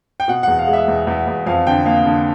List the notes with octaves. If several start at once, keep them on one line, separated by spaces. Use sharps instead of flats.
G5
B2 F#5
E2 F#5
F5
G#3
E5
E2
E2
E2
F2 F5
D3 G5
A#3 F5
D3